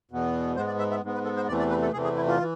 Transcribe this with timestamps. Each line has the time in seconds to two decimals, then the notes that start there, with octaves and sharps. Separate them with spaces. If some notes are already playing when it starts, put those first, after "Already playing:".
0.11 E2 B2 B3
0.56 G#2 G#3 B3 C5
0.68 D5
0.79 E5
0.91 E5
1.03 G#2 G#3 B3
1.14 B4
1.25 A4
1.36 C5
1.48 E2 C3 E3 A3 D5
1.59 D5
1.70 B4
1.82 A4
1.93 E2 C3 E3 A3 G#4
2.04 G#4
2.16 E4
2.27 F4
2.40 E3